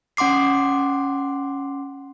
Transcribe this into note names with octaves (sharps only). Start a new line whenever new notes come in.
C#4 F#5 C6 D6 C7